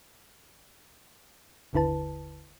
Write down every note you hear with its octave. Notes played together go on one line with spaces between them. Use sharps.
G1 D#2 D3 E4 B4 A5